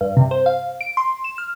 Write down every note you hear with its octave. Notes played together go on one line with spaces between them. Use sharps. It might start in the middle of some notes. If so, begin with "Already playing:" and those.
G2
C3
C5
F5
D7
C6
E7
F6